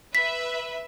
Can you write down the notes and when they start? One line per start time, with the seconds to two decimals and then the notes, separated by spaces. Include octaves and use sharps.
0.15 B4 E5 B6